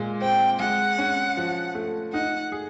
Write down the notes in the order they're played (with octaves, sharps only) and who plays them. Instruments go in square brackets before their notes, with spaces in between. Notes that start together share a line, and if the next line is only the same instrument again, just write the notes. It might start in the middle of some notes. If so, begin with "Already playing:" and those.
Already playing: [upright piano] A#2 G#3
[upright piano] C4 [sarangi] G5
[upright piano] G#3 [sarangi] F#5
[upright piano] C#4
F3
A3
[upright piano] D#4 [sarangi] F#5
[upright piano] G#4